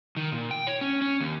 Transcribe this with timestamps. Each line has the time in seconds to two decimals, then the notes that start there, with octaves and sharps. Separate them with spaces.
0.17 D#3
0.32 A#2
0.51 G5
0.67 C#5
0.81 C#4
1.02 C#4
1.20 D#2